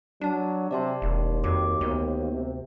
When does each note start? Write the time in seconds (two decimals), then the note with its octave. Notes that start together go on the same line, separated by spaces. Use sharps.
0.21 F#3 D4 D5 A5
0.71 C3 D5 A5 C6
1.02 E1 D#2
1.44 F2 F#4 D6
1.81 D2 B3 C#5
2.32 C3